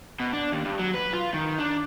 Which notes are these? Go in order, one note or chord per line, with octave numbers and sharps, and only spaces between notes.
B2
D4
D#2
G2
F#3
B4
F4
D#3
D4